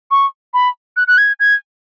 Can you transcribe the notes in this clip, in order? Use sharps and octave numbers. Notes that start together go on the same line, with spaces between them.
C#6
B5
F#6
F#6
G#6
G#6